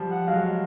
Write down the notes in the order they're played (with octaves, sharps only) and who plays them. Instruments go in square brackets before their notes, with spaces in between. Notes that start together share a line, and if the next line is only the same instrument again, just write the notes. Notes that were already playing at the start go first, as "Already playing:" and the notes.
Already playing: [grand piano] F3 G3
[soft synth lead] F#5
[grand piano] F#3 G#3 [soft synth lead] F5